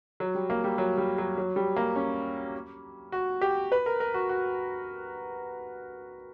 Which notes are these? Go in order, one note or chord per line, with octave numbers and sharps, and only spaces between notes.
F#3
G3
A#3
G3
F#3
G3
F#3
F#3
G3
A#3
C#4
F#4
G4
B4
A#4
A#4
F#4
F#4